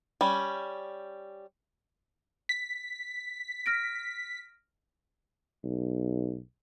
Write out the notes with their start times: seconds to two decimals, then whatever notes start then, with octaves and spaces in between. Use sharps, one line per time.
0.21 G3 C#4
2.49 B6
3.66 F6 A#6 D7
5.64 B1